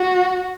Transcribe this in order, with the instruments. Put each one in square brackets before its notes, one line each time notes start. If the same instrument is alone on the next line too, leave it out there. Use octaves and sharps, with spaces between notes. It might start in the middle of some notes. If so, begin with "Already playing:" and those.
Already playing: [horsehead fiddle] F#4